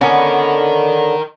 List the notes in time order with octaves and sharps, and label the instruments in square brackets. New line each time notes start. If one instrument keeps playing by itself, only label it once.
[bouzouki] D3 B3 [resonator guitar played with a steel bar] C#4 [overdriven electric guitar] A#4 D#5